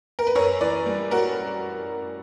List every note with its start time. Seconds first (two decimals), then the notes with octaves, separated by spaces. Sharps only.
0.19 A#4
0.27 B4
0.35 F#2 A#4 C#5
0.61 E3 B4 D5
0.86 G3
1.11 F#4 A#4